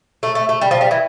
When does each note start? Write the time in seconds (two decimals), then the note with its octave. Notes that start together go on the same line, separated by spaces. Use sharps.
0.23 A3
0.35 A3
0.49 A3
0.61 G3
0.71 F3
0.81 G3
0.91 E3